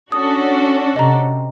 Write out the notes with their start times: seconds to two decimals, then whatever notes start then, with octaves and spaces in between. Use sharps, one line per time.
0.12 C#4 D4 F#4 A4 D#6
0.96 C3 D#5 A#5